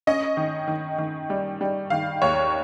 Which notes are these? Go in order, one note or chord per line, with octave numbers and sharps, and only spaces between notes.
C#4 D#5
D#3
D#3
D#3
G3
G3
D#3 F5
D#2 C#5